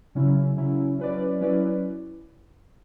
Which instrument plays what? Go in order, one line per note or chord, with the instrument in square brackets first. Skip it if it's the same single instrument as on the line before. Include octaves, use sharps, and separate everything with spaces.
[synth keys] C#3 F#3 C#4 E4
C#3 F#3 C#4 E4
F#3 C#4 E4 B4 D5
F#3 C#4 E4 B4 D5